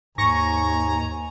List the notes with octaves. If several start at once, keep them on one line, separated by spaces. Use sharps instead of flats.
D#2 G#2 G#5 A#5 C#6 A#6